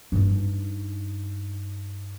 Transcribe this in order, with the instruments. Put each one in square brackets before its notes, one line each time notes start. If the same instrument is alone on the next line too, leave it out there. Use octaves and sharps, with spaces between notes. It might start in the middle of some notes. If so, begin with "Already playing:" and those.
[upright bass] G2 D#4